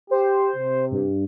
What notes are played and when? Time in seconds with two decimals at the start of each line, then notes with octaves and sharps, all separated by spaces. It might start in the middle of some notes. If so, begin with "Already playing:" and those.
0.11 G4 C5
0.57 C3
0.92 G2